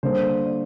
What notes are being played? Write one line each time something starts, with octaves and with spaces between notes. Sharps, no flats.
D3 G3 A#3 C5
D5